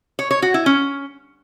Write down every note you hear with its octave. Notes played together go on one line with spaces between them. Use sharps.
C#5
C#5
F#4
E4
C#4